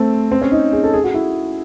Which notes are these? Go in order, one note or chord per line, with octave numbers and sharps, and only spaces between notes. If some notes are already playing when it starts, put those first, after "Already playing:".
Already playing: A3 C4
C4
C#4
D#4
G#4
A4
G#4
F#4
E4